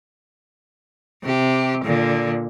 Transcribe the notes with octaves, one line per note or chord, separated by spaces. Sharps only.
C3 G4
A#2 D3